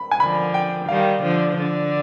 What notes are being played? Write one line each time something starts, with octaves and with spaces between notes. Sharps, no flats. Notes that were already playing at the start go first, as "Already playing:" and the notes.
Already playing: B5
G#5
D3 F3 B5
G5
D#3 G3 F5
D3 F3
D3